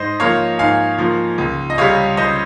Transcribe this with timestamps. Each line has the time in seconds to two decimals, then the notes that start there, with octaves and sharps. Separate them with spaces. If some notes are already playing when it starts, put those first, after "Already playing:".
Already playing: G#2 C5 D#5
0.20 F3 A#3 C#5 F5
0.59 G#2 F5 G#5
0.99 F3 A#3
1.38 C#2
1.70 D#5
1.78 C3 G3 C#5 F5
2.17 C#2 C5 D#5